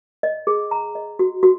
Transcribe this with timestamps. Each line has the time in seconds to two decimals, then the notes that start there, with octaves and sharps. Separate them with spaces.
0.23 D#5
0.47 G#4
0.71 A#5
0.95 D#5
1.19 F#4
1.43 F#4